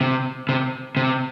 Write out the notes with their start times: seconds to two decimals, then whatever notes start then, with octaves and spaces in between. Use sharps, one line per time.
0.01 C3
0.49 C3
0.97 C3